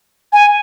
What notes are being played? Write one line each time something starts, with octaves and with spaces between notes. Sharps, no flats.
G#5